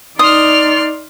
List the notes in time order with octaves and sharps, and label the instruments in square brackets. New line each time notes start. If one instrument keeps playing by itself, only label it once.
[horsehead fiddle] D#4 D5 [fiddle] C6 F6 [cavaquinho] D#6